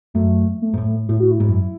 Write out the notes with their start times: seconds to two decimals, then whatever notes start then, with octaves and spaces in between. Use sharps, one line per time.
0.14 F#2 A3
0.62 A3
0.74 G#2
0.78 A2
1.09 A2 E4
1.20 F#4
1.31 E4
1.40 G#2
1.49 F#2